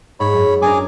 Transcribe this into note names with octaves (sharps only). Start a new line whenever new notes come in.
G#2 C#5 B5
F#2
C#4 D4 G#4 A#4 G#5 D6